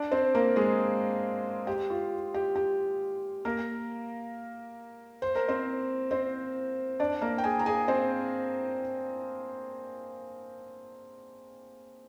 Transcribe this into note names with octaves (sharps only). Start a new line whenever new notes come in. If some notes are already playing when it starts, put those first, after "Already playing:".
Already playing: D4 D5
C4 C5
A#3 A#4
G#3 G#4
G4
F4
G4
G4
A#3 A#4
C5
A#4
C4 C5
C4 C5
D4 D5
A#3 A#4
G5
G#4 G#5
A#5
G#4 G#5
C4 C5